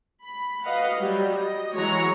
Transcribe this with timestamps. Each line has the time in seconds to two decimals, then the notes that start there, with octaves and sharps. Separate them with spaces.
0.24 B5
0.64 F#4 B4 D#5 F5 F#5
0.96 F#3 G3
1.35 D#5
1.74 E3 F#3 G#3 C#5 A#5